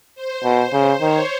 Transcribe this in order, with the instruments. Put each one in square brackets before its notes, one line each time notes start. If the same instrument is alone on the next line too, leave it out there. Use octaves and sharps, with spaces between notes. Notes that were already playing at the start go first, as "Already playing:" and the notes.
[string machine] C5
[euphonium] B2
C#3
[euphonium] D#3 [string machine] C#5